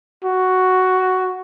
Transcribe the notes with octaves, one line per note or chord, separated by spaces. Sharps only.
F#4